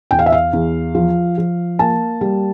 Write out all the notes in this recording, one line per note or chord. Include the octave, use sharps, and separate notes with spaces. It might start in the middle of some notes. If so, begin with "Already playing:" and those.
E2 G5
F5
E5
F5
E2
F3
F3
A#3 A5
G3